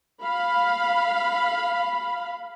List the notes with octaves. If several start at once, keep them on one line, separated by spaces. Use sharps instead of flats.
F5 B5